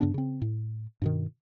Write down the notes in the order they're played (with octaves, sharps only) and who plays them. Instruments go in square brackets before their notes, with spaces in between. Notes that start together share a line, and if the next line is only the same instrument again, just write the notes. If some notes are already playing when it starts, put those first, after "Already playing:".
[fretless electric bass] G2 C#3 B3 D4
C#3 C4
A2
G2 B2 D#3